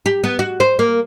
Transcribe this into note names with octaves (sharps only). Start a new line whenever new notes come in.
G4
B3
F#4
C5
A#3